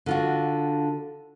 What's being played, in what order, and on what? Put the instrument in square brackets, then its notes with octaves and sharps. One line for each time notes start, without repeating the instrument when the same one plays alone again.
[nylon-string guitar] D3 F4 F#4